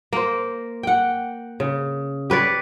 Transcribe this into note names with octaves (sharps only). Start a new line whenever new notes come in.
A#3 C5
F#5 G5
C#3
G4 B4 C#5 D5